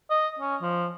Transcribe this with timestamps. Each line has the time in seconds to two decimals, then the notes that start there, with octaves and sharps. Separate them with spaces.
0.10 D#5
0.39 C#4
0.61 F3